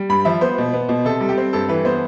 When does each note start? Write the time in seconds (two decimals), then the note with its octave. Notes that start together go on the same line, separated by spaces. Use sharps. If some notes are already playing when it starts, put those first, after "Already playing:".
Already playing: G3
0.09 G2 B5
0.25 F3 E5
0.41 B3 C5
0.58 B2
0.74 B3
0.89 B2
1.05 C3 A4
1.21 G3
1.29 G4
1.38 C4
1.53 G2 A4
1.68 E3 B4
1.85 B3 C5